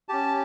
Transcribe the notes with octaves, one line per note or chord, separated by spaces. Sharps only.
C#4 G4 A5